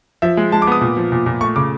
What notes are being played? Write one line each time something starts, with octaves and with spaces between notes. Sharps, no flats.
F3 E5
G#3
G#3 A5
D6
B3 D#6
A#2
F3
A#2
A#2
A3 C#6
C#3 D6